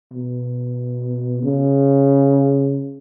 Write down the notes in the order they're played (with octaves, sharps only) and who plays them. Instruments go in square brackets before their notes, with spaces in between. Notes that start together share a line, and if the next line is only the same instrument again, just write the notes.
[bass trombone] B2
C#3